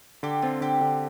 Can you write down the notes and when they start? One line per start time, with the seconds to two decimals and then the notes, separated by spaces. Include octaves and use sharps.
0.23 D3 G4
0.42 C4 F4
0.61 D3 G4
0.81 D3